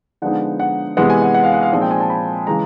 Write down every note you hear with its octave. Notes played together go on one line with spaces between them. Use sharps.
D3 F3 G#3 B3 D#4 F#5
F#5
C3 E3 G#3 B3 F#5
G#5
F#5
F#5
F5
F#5
F5
A#2 F3 G#3 C4 D#4
G5
G#5
A5
B5
C#3 E3 G#3 A#5